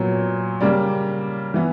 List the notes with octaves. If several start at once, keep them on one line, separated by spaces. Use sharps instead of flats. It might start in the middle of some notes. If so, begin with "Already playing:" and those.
Already playing: A#2 F#3 B3
C#3 G3 A#3 D5
E3 B3